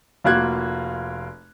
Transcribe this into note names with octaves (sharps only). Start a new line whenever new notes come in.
F1 A#3 F4 F#4 F#6 G#6